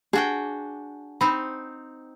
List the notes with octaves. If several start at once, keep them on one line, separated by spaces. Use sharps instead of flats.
D4 F#4 G#4 G5
C4 D#4 B5